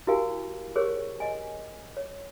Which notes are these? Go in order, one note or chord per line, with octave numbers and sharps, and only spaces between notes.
E4 F#4 G4 A#4 F5 G#5
G4 G#4 A#4 C5 C#5 C#6
D#5 G#5
C#5